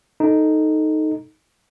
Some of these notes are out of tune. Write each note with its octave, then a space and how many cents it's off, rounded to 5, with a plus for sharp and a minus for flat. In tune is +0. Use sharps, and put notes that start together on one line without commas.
D#4 +0 A4 +0